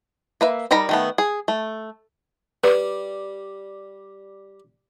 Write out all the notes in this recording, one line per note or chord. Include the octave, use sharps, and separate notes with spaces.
A#3 B4 E5
G3 D#4 A#4 A#5 B5
D#3 A3 B3
G#4
A3
G3 B4